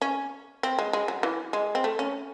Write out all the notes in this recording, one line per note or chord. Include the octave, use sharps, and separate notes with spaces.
C#4
C4
G#3
G#3
F#3
E3
G#3
C4
A3
C#4